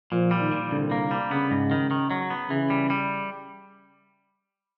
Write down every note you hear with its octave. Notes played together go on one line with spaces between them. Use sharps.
A#2 F3
G3
D#3
A#2
C2 D3
A#3
G3
C#3 B3
G#2
D#3
D#3
F#3
B3
C#3 E3
G3
G3